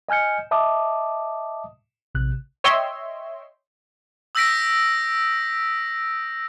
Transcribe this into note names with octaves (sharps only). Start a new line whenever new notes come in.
D#5 G#5 F6 G6 C#7
D#5 E5 A5 D6 D#6
A#1 C3 F#6
C#5 D#5 E5 G5 C6
D#6 E6 G6 A#6 B6 D7